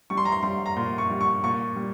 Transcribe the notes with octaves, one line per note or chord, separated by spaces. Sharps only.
G3 C#6
C6
A#5
C6
G3 C6
A#5
A#2 C6
C#6
G3
C#6
A#2 C#6
G3